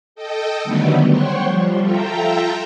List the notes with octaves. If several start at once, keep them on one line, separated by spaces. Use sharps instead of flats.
A4 D#5 G5
D3 D#3 F#3 G3 A3 B3
C5 C#5 F#5 G5 C6 C#6
F3 G3
F4 A4 E5 G5 A#5